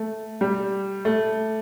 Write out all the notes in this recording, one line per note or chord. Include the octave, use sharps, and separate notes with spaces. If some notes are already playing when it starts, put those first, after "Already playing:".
Already playing: A3
G3
A3